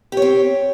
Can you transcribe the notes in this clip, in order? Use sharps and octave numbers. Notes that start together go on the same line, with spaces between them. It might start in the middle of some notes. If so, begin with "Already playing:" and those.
C4 G4 C#5